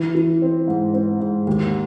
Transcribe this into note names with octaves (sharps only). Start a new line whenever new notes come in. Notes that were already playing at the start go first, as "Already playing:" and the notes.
Already playing: E3
E3
C4
G#2
C4
G#2
D#2